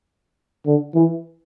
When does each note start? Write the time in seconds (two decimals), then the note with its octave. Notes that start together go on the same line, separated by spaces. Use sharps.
0.66 D3
0.95 E3